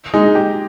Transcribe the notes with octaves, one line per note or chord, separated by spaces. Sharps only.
G#3 D#4
G4